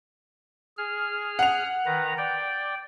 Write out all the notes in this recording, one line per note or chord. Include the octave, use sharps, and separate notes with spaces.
G#4 F6
F#5 F7
D#3 B4 A#5
D5 G5